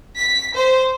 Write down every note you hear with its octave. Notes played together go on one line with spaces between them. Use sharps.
B6
C5